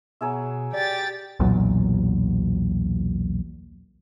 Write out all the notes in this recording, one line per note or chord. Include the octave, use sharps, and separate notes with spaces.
B2 F#3 G#4 E5
G4 D5 A6
B1 E2 A#2 F#3